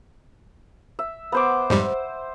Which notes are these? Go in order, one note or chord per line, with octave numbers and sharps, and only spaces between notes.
E5
B3 C5 D6
F2 G#2 G3 C5